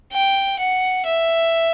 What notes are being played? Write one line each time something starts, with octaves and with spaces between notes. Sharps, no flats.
G5
F#5
E5